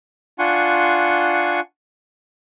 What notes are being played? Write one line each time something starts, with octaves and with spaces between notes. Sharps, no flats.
D4 F4 F#5 G#5 C6 C#6